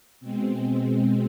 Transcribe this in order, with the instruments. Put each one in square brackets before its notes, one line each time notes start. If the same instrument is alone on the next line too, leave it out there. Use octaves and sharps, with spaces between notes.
[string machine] B2 G#3 C4